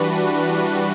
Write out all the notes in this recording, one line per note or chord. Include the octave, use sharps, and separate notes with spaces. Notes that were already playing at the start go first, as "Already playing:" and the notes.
Already playing: E3 G3 D4 F#4 B4